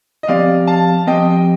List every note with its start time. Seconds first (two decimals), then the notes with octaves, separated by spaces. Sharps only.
0.23 D#5
0.28 F3 C4 G4 D5 F5
0.67 F5 A5
1.07 F3 C4 G4 D#5 G5